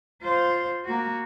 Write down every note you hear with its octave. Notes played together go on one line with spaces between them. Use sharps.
F4 C5
A#3 F#4